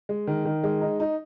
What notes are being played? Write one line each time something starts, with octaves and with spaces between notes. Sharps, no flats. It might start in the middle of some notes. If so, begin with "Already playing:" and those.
G#3
D#3
D#3
G#3
D#4
D#4